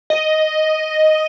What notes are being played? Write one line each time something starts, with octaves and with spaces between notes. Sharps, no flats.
D#5